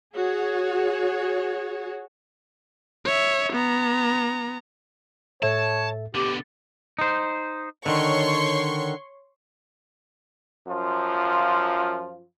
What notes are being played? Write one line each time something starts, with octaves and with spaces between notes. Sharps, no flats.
F#4 G#4 C#5
C#5 E5
B3 A#5
A2 A4 C#5 E5 A5
B2 D3 G4
D#4 C5
D3 D#3 C#5 C6 C#6
F#2 F3 F4